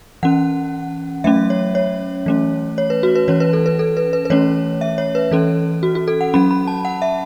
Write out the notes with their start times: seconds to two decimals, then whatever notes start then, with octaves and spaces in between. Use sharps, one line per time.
0.23 E3 C#4 F#5
1.24 F#3 A3 C#4 E5
1.50 C#5
1.75 C#5
2.26 E3 A3 C#4
2.78 C#5
2.90 B4
3.03 F#4
3.15 B4
3.28 E3 C#4 C#5
3.40 B4
3.53 A4
3.66 B4
3.79 A4
3.97 B4
4.13 B4
4.25 B4
4.30 E3 A3 C#4 C#5
4.81 E5
4.98 C#5
5.15 B4
5.31 E3 C#4 A4
5.83 F#4
5.95 F#4
6.08 A4
6.21 F#5
6.34 F#3 C#4 B5
6.51 B5
6.67 A5
6.85 F#5
7.02 E5